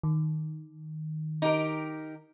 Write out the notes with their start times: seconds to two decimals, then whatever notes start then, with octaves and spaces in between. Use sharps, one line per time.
0.03 D#3
1.42 D#4 G4 A#4